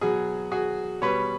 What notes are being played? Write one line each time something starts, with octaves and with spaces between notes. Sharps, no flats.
B2 F#3 F#4 G#4
F#4 G#4
B2 G3 B4 C#5